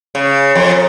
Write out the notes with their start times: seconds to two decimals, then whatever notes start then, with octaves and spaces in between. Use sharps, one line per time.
0.15 C#3
0.55 F2